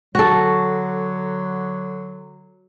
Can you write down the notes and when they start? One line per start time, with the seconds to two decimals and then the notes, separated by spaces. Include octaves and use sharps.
0.15 D3 F#3 F#4 A4